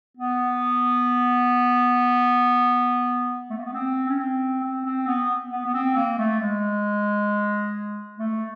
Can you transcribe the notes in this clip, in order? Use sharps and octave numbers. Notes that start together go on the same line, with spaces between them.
B3
A3
A#3
B3
C4
C#4
C4
C4
C4
B3
B3
B3
C4
A#3
A3
G#3
A3